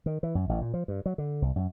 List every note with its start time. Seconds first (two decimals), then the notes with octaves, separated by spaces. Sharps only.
0.06 D#3
0.23 E3
0.35 F#2
0.49 A1
0.61 A#2
0.74 F3
0.88 G2
1.06 F#3
1.18 D3
1.42 C2
1.56 F#2